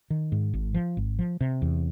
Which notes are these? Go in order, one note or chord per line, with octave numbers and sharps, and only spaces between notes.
D#3
G#2
G#1
F3
G#1
F3
C3
E2